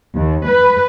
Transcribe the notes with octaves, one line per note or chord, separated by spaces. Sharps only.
D#2
B4